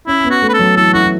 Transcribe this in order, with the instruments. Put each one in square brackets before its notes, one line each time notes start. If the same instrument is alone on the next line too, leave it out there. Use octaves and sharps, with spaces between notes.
[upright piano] C#4 [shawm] E4
[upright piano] B3
[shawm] F#4
[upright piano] A3
[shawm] B4
A4
[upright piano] F#3
[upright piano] E3 [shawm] A4
[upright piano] E4 [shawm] F#4
[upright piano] E4